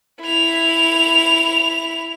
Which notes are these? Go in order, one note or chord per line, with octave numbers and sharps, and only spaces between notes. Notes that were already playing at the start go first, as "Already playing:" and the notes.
E4 F7